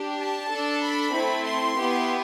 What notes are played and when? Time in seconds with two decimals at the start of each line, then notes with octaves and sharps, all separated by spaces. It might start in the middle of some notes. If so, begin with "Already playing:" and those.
Already playing: D4 G4
0.20 A5
0.51 D4 A4
0.83 B5
1.13 A3 C4 E4
1.45 C6
1.76 B3 E4 G4